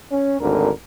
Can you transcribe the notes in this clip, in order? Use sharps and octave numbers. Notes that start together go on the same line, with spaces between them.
C#4
G#1 D2 D3 A#4